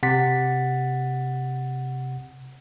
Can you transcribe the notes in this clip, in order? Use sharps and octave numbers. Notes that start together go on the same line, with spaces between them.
C3 F#5 A6 B6